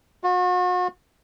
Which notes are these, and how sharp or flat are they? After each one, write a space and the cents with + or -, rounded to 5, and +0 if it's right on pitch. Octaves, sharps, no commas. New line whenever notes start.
F#4 -40